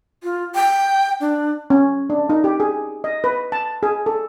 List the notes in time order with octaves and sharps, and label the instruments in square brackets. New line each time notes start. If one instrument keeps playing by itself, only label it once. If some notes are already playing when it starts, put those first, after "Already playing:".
[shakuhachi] F4
G5
D4
[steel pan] C#4
D4
D#4
G4
G#4
D#5
B4
A5
G#4
A4